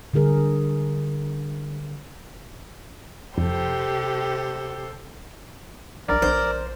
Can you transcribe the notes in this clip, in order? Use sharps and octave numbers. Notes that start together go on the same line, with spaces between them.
D3 G3 G#4 A#4
F2 C3 G4 A4 C5
A#1 A#4 D5
A#1 C5